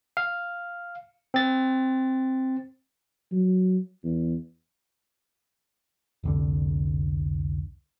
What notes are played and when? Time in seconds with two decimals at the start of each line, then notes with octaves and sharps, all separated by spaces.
0.17 F5
1.34 C4 A6
3.32 F#3
4.04 E2
6.24 F1 C2 D3